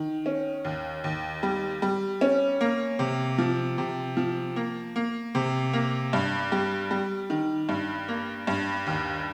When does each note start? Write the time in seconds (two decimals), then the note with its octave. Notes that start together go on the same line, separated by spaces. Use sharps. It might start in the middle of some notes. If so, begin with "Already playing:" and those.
Already playing: D#3
0.26 C#4
0.65 D#2
1.04 D#2
1.43 G3
1.82 G3
2.21 C#4
2.61 A#3
2.99 C3
3.38 F3
3.78 C3
4.17 F3
4.56 A#3
4.96 A#3
5.35 C3
5.73 A#3
6.13 G2
6.52 G3
6.91 G3
7.30 D#3
7.69 G2
8.08 A#3
8.47 G2
8.87 D#2